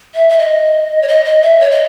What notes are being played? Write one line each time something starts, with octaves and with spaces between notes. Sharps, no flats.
E5
E5
D#5
C#5
D#5
D#5
E5
C#5
D#5